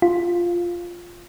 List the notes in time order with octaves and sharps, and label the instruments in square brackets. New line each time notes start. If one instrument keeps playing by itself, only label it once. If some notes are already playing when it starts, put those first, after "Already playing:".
[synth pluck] F4